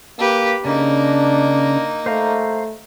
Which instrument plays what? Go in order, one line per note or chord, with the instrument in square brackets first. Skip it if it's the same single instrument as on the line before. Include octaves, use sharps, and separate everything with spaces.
[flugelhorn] A#3 [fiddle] G4 B4
[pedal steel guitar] C#3 [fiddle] A#3 D#4 [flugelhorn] D4
[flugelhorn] A3 [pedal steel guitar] C5 F5 A#5